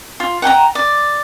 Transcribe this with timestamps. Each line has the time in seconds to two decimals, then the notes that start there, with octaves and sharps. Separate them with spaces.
0.20 F4
0.42 F#5 G5 A5 A#5
0.75 D5